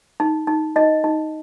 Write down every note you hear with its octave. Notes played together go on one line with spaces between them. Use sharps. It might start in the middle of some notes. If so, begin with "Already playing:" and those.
D#4
D#4
D#4 D#5
D#4